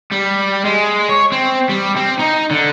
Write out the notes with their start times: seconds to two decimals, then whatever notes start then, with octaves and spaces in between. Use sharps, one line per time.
0.12 G3
0.65 G#3
1.09 C#5
1.32 C4
1.69 G3
1.97 C4
2.19 D#4
2.51 D3